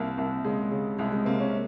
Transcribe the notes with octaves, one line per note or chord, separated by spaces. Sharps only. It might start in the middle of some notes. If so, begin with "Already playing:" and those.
Already playing: C2 A#3
C2 A#3
C#3 G#3
C#3
C2 G#3
G#3
C3 A#3
C#4